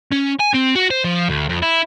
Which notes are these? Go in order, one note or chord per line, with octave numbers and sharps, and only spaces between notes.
C#4
G#5
C4
F#4
C5
F3
D2
F2
E4